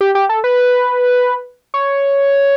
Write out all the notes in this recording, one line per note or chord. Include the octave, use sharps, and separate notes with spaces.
G4
G4
A4
B4
C#5